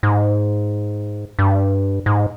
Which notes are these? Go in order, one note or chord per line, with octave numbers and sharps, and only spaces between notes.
G#2
G2
G#2